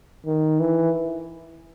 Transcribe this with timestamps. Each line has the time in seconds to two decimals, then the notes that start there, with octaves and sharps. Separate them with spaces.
0.26 D#3
0.60 E3